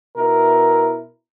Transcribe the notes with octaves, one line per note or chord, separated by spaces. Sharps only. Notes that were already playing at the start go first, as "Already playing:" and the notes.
B2 E4 A#4